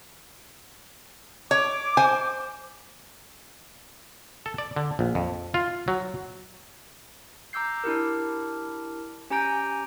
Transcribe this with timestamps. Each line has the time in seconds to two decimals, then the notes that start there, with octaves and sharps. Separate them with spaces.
1.51 C#5 D6
1.97 C5 G#5
4.46 A4
4.58 D5
4.76 D3
4.99 A#1
5.15 F2
5.54 F4
5.88 F#3
7.53 A#5 D6 E6 G6 C7
7.84 D4 E4 G4 A#4
9.30 C#4 G4 G#5 A#5 G6 D7